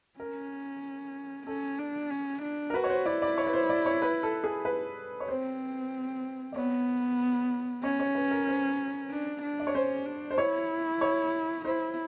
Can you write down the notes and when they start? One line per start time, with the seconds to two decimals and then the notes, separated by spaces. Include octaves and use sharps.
0.20 C#4 A#4
1.47 C#4 A4
1.79 D4
2.10 C#4
2.42 D4
2.70 A#4
2.74 F#4 B4
2.84 C#5
2.90 C5
3.06 E4 D5
3.22 D5
3.38 C#5
3.46 B4
3.53 C5
3.69 D5
3.86 C#5
4.02 B4
4.23 A4
4.44 G#4
4.65 B4
5.20 C#5
5.28 C4 C5
6.52 D5
6.56 B3 C#5
7.83 C#4 C#5
8.00 C#5
8.15 B4
8.31 A#4
8.48 C5
9.11 D4
9.42 D4
9.60 D5
9.67 C#5
9.74 C#4 C5
10.06 D4
10.31 C5
10.38 E4 C#5
11.01 C#5
11.65 E4 C5